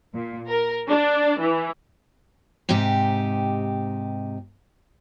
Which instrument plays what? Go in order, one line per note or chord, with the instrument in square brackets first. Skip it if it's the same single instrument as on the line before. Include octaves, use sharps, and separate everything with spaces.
[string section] A#2
A#4
D4
E3
[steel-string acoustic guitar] G#2 C3 D#4 G4